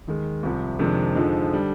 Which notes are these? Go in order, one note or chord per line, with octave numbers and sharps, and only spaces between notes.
D#2 D#3 G#3
C2 C3 F3 C4
F2 C3 D#3 G#3 D4
F2 D3 F3 G#3 D#4
D3 G3